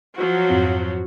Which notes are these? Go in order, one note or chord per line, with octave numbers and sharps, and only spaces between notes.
F3 F#3 F#4
F2 G#2 C4